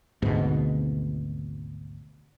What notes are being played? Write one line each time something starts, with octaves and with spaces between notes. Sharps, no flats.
G#1 D2 G#2 B2